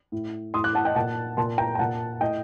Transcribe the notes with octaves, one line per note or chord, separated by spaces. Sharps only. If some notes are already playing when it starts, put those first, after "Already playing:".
A2
A2 C6 D#6
D6 F#6
F#5 A5
D#5 G5
A#2 F#5 A5
A#2 A5 C6
G5 A#5
A#5
A#2 F#5 A5
A2 D#5 G5